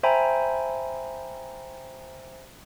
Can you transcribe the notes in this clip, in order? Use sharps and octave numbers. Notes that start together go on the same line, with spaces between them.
C5 E5 G5 G#5 A#5 B5